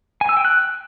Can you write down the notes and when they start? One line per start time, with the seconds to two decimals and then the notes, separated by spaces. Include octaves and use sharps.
0.21 G#5
0.29 E6
0.37 G5
0.45 F#6